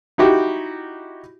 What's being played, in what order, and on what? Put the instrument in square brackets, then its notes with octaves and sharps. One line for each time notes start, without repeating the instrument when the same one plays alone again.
[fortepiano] D#4 E4 F#4 G4